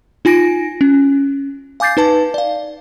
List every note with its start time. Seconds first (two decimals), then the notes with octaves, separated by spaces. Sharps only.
0.25 D#4 F4 G#5 A#6 D7
0.81 C#4
1.80 F5 G#5 D6 G6 A6 C7
1.97 D#4 B4 A5
2.34 D5 F5